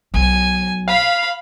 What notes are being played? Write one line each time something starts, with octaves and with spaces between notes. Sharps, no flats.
B1 G#5
F5 B5